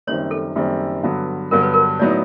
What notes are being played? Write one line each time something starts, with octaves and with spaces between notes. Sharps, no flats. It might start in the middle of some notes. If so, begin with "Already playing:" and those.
F#1 F#2 D#3 G3 C4 C#5
A4
F#1 F#2 D#3 G3 C4
G2 D3 F#3 B3
G2 D3 F#3 B3 A#4
B4
A#4
A2 F#3 B3 D#4 D5